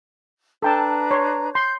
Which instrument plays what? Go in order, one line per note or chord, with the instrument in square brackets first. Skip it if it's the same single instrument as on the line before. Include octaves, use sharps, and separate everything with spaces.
[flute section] D4 B4 A#5 [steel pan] A4 G5 A5
[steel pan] C#5 C6
[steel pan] C6 [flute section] G6